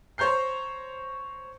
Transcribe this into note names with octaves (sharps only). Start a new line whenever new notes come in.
C5 C#5 A#5 G6 C7